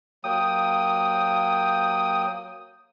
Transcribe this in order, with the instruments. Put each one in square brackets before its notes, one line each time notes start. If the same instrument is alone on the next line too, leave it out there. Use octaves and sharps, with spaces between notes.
[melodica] F#3 A#3 G5 [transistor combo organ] D#6